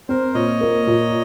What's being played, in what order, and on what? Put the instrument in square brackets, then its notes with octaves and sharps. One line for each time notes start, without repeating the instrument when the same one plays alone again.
[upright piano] C4 [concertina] A#4 C5
[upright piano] A#2 [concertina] C#5 D#5
[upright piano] A#3
A#2